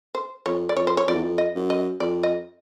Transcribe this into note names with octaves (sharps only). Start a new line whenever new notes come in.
C5
F2 C#5
D5
F2 C#5
C5
C#5
F2 D5
E2
F2
D#5
F#2
D#5
F2 D5
D#5